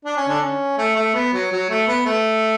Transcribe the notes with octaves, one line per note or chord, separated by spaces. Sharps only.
D4
C#4
D3 D4
C#4
A3
A3
B3
F#3
F#3
A3
B3
A3